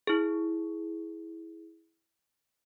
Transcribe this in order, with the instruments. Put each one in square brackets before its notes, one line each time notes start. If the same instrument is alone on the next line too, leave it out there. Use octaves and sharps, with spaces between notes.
[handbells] E4 G#4